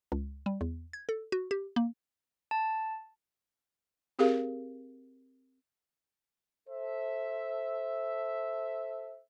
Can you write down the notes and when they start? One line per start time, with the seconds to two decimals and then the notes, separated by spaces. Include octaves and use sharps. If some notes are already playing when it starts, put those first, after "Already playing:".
0.12 C#2
0.46 G3
0.61 E2
0.93 G#6
1.09 A4
1.32 F#4
1.51 G4
1.76 A#3
2.51 A5
4.19 C4 G4 G#4 A#4 F5
6.68 A4 C5 E5